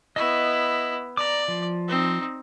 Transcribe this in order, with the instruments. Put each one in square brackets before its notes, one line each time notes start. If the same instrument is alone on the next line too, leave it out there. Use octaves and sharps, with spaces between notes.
[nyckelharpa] B3 E4 [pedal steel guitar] D#5 C#6
[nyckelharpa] D5 [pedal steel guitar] A#5 D6
[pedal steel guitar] F3
[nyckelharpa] C4 D#4